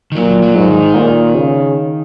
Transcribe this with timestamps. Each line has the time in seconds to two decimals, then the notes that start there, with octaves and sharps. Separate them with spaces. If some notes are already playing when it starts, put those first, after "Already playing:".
0.12 D#3
0.16 A#2 F#3
0.42 F#3
0.56 G#2
0.69 D#3
0.95 A#2
1.35 C#3